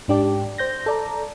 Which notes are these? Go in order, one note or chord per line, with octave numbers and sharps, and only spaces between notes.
G#2 D4 G4 D5
C5 G6 A#6
A4 D5 A#5